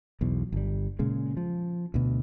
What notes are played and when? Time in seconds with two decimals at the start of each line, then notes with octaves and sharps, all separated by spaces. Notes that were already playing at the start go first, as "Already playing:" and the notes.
0.21 B1 E2 B2
0.52 G1 G3
0.99 A#2 C#3 G#3
1.37 F3
1.94 D2 B2